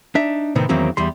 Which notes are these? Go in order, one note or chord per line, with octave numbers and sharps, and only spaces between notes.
D4 D#4 E5
A2 C3 D#3 B3 C4
E2 D#3 F#3 A#3 C4 C#4
E2 G3 C6